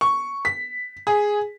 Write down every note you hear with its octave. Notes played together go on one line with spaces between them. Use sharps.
C#6
B6
G#4